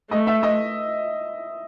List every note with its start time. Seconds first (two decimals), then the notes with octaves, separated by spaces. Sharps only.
0.11 A3 D#5
0.27 E5
0.43 D#5